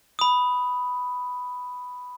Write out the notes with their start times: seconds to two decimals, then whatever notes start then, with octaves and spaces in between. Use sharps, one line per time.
0.19 B5 D#6